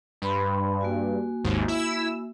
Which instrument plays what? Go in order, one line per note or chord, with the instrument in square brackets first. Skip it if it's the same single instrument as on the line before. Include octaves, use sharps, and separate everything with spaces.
[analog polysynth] G2 [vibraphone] B4 B5 C6
[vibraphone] A#3 F#4 G#5
[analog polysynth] G#1 D#2 G#2
E4 E6